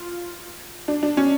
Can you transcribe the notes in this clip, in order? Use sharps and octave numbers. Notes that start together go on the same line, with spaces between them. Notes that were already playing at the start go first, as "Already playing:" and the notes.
Already playing: F4
D4
D4
C#4